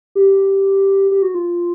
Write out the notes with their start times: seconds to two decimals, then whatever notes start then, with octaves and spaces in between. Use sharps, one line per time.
0.15 G4
1.11 G4
1.22 F#4
1.34 F4